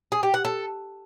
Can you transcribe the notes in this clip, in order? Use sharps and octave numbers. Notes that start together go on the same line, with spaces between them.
G#4
G4
F#5
A4